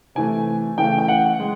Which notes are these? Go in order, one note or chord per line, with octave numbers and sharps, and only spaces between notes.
C3 E3 A3 G#5
C#3 E3 A3 G5
G5
F#5
G#3